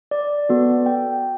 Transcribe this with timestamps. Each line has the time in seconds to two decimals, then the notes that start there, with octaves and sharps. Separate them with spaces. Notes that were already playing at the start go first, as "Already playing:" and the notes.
0.11 D5
0.49 B3 F#4 A4
0.86 G5